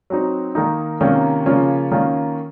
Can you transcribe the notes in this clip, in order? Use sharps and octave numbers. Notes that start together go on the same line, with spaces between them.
F#3 C4 D#4
D#3 A#3 D#4
C3 D#3 A#3 C#4 F4
C#3 F3 A#3 C#4 F4
D#3 A#3 C#4 F4